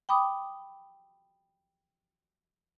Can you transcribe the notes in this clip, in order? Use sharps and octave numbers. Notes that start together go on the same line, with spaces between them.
G5 B5 D6 D#6